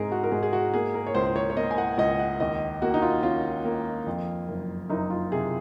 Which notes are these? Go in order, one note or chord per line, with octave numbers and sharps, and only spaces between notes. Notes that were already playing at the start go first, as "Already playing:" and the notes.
Already playing: G#2 C4 G#4 A#4
F#4
A#4
G#2 G#4
G#4
F#4
A#3 G#4
A#4
C#5
C#2 C5
C5
C#5
C#5
A#3 D#5
G#5
F#5
C#2 D#5
F#5
D#2 D#5
A#3 F#4
D#4
F4
C#4 F4
A#3
F2
F#1
F#1 D#4
F4
C3 G#4